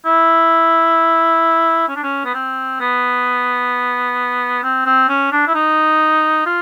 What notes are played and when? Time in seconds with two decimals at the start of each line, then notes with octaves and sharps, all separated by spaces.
0.05 E4
1.88 C#4
1.96 D4
2.03 C#4
2.25 B3
2.34 C4
2.80 B3
4.63 C4
4.86 C4
5.09 C#4
5.32 D4
5.47 E4
5.54 D#4
6.46 F4